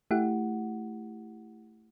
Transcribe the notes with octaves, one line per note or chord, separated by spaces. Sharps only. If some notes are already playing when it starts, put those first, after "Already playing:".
A3 E4 G4 F#5